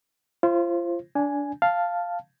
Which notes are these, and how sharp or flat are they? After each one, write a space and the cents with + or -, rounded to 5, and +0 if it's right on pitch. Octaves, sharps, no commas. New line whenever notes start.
F4 -30 C5 +15
D4 -20 G#5 +5
F5 +0 A5 +0